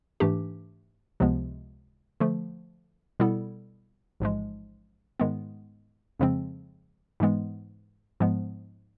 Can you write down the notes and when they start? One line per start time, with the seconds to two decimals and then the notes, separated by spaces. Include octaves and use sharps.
0.20 G#2 E3 A3 D4 G4
1.20 C#2 C3 F3 G#3 B3
2.20 D3 F3 A3
3.20 B2 G3 B3 E4 A4
4.20 A1 G#2 F3 G#3
5.20 G#2 D#3 G#3 B3
6.20 F2 C#3 F3 G#3 C4
7.20 G#2 E3 G#3 B3
8.20 G#2 F3 G#3 B3